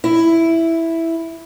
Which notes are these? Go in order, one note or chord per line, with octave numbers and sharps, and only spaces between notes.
E4